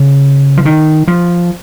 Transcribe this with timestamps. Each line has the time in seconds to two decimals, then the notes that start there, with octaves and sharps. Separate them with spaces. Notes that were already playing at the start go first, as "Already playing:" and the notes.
Already playing: C#3
0.57 F3
0.65 D#3
1.08 F3